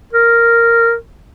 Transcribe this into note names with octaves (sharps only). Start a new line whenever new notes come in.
A#4